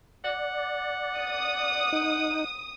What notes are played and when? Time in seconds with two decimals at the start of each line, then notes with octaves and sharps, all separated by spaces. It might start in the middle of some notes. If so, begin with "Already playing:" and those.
0.24 D5 F#5
1.18 D#6
1.92 D#4